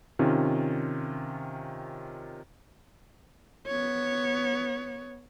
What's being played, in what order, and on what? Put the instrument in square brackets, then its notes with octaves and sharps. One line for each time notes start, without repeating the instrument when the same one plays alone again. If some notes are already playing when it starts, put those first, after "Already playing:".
[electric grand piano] C3 D#3 C#4 F4
[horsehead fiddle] B3 C#5